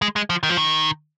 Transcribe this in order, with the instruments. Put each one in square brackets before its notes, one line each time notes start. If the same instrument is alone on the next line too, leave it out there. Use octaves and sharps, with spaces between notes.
[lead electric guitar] G#3
G#3
F3
D#3
F3
D#3